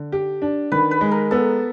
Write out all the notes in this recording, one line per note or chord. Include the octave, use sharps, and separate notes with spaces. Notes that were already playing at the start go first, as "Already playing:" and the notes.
Already playing: D3
G4
D4
D#3 B4
B4
G#3
A#4
B3 A4